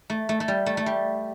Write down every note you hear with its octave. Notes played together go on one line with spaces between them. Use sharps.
A3
A3
A3
G3
A3
A3
G3